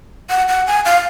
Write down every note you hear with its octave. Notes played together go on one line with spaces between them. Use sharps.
F#5
F#5
G#5
F5